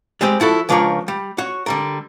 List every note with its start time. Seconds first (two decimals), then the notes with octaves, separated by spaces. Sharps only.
0.21 G3 G#3 C4 G4
0.40 F3 E4 F#4 A4
0.69 C#2 F3 D4 F4 A#4 C#5
1.08 G3
1.38 F#4 C#5
1.66 D3 G3 A#4